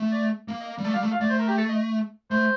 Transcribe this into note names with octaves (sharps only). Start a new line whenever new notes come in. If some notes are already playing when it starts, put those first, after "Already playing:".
Already playing: A3
D5
A#3
D#5
G3
A3 D5
G3 F5
A3
F5
A3 D5
C5
A#4
G4
A4
D#5
A3 C5